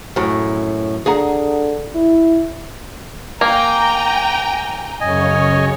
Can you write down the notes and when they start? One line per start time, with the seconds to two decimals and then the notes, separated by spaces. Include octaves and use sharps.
0.16 F#2 A2
1.06 D3 G#4 F#5 A#5
1.95 E4
3.41 A#3 G5 G#5 A#5
5.01 F#2 C#3 C#5 D#5 G#5